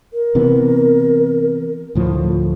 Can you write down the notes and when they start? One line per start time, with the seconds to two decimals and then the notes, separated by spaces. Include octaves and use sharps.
0.13 A#4
0.35 C3 E3 B3
1.95 D2 A2 F3